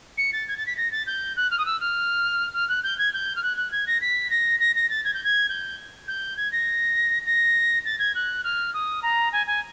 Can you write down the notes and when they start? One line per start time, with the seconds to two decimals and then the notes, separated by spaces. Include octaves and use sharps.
0.17 C#7
0.33 A6
0.48 G#6
0.57 A6
0.66 B6
0.77 A#6
0.91 A6
1.06 G6
1.36 F#6
1.51 F6
1.58 D#6
1.65 E6
1.80 F6
2.53 F6
2.69 F#6
2.83 G6
2.98 G#6
3.13 G6
3.36 F6
3.43 F#6
3.57 F#6
3.71 G#6
3.87 A#6
4.01 B6
4.30 A#6
4.60 A#6
4.75 A#6
4.90 A6
5.04 G#6
5.14 G6
5.24 G#6
5.49 G6
6.08 G6
6.37 G#6
6.52 A#6
7.26 A#6
7.85 A6
7.99 G#6
8.15 F#6
8.44 F6
8.73 D#6
9.02 A#5
9.32 G#5
9.46 G#5